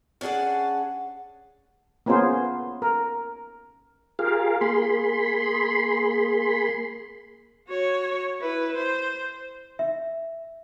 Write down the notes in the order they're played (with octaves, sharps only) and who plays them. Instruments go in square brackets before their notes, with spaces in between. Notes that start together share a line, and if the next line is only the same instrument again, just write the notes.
[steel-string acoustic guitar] C#4 D4 G#4 F#5 A5
[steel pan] A#3 B3 C#4 F4 G#4 C5
A#4
[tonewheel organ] F4 G4 G#4 A#4 F5
A#3 G#4 B5 C6
[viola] F#4 C#5
E4 B4
C5
[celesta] E5